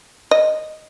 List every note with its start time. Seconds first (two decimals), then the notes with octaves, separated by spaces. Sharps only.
0.31 D#5